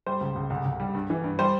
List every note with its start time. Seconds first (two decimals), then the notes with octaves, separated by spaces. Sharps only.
0.06 G3 C5
0.21 C#2
0.36 C#2
0.50 C2
0.65 C2
0.80 G3
0.95 G2
1.10 E3
1.24 G2
1.39 G3 C5